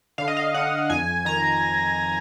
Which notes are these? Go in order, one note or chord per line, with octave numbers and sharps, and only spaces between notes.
D3 F5
D#5
F5
D3 F#5
F2 G#5
D#3 A#5